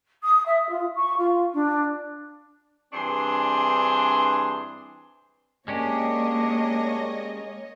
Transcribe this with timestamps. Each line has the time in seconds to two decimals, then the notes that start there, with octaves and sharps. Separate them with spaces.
0.22 D#6
0.45 E5
0.68 F4
0.94 C#6
1.17 F4
1.53 D4
2.93 G2 E3 C4 D4 G#4 C6
5.68 G#3 A#3 C#4 D4 G4 C#5 D#5